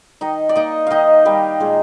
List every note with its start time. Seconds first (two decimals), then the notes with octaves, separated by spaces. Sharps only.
0.21 D#3 D#4 D#5
0.49 D5
0.56 A#3 D#4 D#5
0.87 D#3 D#4 D#5 F5
1.25 G3 A#3 G4
1.60 A#2 G#3 G#4